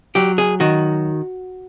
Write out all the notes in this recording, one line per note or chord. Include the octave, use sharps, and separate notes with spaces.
F#3 G4
G#4
D#3 F#4